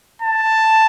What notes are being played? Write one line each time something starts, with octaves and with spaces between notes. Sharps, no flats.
A5